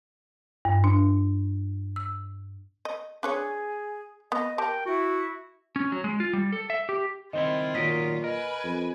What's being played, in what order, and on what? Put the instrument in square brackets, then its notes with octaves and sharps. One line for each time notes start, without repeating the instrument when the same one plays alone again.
[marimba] G2
D4
E6
[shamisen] D#5
[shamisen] D4 B4 C#5 [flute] G#4
[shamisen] B3 [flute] D#5
[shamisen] G4 A5 [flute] A#4 [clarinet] G5
[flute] E4 [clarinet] F#4
[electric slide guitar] C#4
F#3
G#3
F4
G3
A4
E5
G4
[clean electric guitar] D#3 C4 E4 [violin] F4 [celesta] D#5
[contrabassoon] A#2 [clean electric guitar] D#3 F#3 D#5 [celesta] B6 D7
[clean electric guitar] A#4 [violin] B4 G#5 [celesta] D#5
[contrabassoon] F2